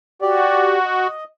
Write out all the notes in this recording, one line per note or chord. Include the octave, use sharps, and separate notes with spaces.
F#4 G4 D5
D#5